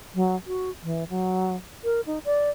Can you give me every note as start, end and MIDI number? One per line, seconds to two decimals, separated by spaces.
0.15 0.36 54
0.47 0.70 66
0.83 1.04 52
1.09 1.56 54
1.84 2.01 70
2.06 2.19 63
2.25 2.50 74